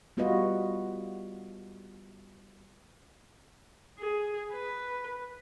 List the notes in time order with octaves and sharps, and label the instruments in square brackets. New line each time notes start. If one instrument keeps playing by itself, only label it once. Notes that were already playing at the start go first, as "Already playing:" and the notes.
[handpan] G3 B3 F4 F#4 B4 D#5
[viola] G#4
B4